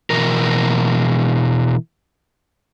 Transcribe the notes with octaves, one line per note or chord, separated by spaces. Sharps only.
B2 E3 A#4